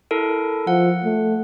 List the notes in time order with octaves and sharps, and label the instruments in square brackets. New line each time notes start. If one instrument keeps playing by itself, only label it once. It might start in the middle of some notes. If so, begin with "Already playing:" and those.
[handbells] E4 A4 A#4
[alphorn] F3 [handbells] F#5
[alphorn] A3